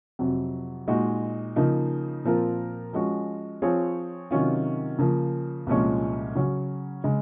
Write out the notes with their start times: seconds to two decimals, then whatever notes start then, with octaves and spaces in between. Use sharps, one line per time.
0.19 F2 C3 F#3
0.88 A#2 G#3 D#4 F#4
1.56 C#3 F3 A#3 D#4
2.24 A#2 F3 C4 F4 A#4
2.93 F3 G#3 C#4 F#4
3.62 F3 C4 F4 G#4 C#5
4.31 C3 D#3 F#3 C#4 F4
4.98 C#3 F3 A#3
5.67 C2 A#2 F3 G#3 C#4
6.35 C#3 F#3 C#4
7.04 C#3 G#3